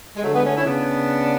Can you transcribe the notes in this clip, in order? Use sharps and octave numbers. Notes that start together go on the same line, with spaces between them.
G#3
D3 F#3 A3
G#3 B3
A3 C#4
C#4 E4
C#3 B3 D4